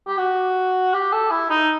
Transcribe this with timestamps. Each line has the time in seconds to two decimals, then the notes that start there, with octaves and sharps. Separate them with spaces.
0.08 G4
0.18 F#4
0.93 G4
1.12 A4
1.31 E4
1.50 D#4